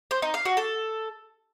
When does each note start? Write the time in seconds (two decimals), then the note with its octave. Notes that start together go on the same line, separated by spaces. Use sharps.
0.11 C5
0.22 D#4
0.34 F5
0.45 F#4
0.57 A4